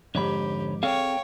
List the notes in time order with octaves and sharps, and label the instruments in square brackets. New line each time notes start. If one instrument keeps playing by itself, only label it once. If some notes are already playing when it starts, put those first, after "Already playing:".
[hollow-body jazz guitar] F2 G#2 [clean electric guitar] D3 C#5 B5 [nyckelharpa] G4
[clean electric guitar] C4 G#4 A4 [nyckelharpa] C#5 [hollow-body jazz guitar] F5 [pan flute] G5